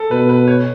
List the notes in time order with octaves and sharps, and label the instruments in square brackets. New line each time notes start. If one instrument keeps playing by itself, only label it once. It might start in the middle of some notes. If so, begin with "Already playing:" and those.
Already playing: [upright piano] A4
[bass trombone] B2 [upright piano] B4
[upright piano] B4
C#5